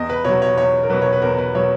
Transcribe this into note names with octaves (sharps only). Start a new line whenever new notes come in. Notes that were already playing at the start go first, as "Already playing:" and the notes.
Already playing: E2 D#5
B4
B2 F#3 C#5
C#5
E2 C#5
A#4
B2 F#3 B4
C#5
B4
E2 A#4
B4
B2 F#3 C#5